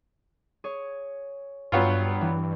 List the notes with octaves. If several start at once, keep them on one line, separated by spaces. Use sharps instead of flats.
G#4 C#5
G2 F#3 B3 F4 G5 C#6 E6
E3